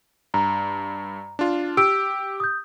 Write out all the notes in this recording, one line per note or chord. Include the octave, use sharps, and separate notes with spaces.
G2 A#5
D4 F4
G4 E6 D7
D#6 G6